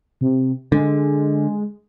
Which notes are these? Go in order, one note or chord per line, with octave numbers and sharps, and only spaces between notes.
C3
D3 G#3